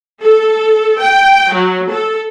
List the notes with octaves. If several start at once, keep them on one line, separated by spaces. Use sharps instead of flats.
A4
G5
F#3
A4